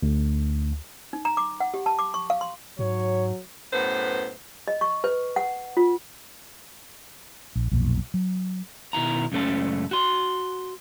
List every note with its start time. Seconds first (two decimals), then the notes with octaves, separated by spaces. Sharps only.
0.03 D2
1.13 D#4
1.25 A#5
1.37 D6
1.60 F#5
1.74 G4
1.86 A5
1.99 D6
2.14 C#6
2.30 F5
2.41 C6
2.79 G#2 F#3 C#5
3.73 F#2 A2 B3 B4 C5
4.68 D#5
4.81 C#6
5.04 B4
5.36 F#5
5.77 F4
7.56 A#1
7.72 B1 F2 A#2
8.14 F#3
8.93 B2 D#3 E4 A#5
9.32 C#2 F#2 A3 C#4 A5
9.91 F#4 C6